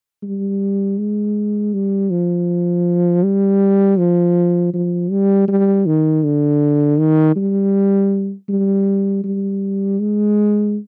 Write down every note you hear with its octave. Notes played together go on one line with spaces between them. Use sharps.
G3
G#3
G3
F3
G3
F3
F3
G3
G3
D#3
D3
D#3
G3
G3
G3
G#3